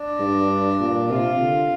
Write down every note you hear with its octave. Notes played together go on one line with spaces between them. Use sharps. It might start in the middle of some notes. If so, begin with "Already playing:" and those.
Already playing: D4
G2
A#2
C3 F4
D3